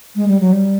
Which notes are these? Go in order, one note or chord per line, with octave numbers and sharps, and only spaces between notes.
G#3
G3
F#3
G3